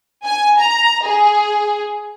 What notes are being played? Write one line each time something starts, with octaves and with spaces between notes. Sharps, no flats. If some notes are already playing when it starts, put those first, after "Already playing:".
G#5
A#5
G#4